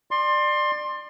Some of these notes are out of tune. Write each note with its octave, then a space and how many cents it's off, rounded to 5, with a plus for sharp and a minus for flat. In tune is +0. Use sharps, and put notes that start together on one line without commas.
D5 +25 C6 +20